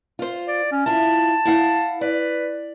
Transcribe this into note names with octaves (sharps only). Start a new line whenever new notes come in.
F4 C5
D5
C#4
E4 F4 A5
E4 F5 F#5
B4 D5